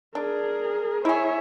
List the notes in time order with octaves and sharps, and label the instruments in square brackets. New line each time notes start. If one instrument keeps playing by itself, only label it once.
[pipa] D4 [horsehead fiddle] G#4 A#4
[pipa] E4 G#4 [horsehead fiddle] C#5 E5